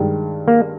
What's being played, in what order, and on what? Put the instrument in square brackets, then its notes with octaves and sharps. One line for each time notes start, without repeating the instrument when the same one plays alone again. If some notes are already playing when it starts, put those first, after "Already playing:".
Already playing: [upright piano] G2 D#3 G#3
[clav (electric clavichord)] A#3